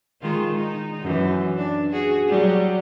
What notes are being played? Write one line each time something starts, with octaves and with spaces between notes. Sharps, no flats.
D#3 G#3 F4
D#4
F#2 E3
D4
F#4 G#4
F#3 G3